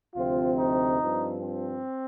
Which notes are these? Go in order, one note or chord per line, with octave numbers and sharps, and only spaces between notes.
D2 C3 F3 C4 F4
D#4
G2 F3 C4
C4